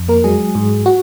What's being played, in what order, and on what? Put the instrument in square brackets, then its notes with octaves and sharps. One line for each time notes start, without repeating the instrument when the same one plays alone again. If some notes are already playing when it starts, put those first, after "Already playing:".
Already playing: [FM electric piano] F2
A#3 A#4
F#3 G#3 G#4
G#2
F#4